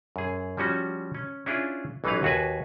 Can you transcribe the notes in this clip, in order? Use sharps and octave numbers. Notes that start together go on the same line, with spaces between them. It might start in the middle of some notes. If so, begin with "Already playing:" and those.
F#2 G#4
F3 G3 C#4 F#4
C#4
C#4 D4 E4 F4 G#4
A1 E3 F#3 D#4 B4 F5
D#2 F#4 G#4 B4 G#5